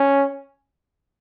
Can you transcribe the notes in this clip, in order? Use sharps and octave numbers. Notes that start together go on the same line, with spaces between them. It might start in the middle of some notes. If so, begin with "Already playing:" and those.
Already playing: C#4